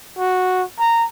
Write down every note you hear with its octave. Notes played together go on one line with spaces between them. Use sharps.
F#4
A#5